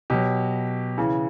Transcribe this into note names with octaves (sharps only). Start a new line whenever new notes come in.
B2 F#3 G4
C#3 E3